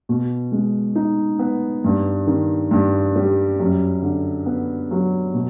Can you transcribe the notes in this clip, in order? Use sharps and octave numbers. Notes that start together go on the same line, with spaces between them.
B2
G#3
D#4
B3
G2
D#3
G2
G3
F#2
D3
B3
F#3
B2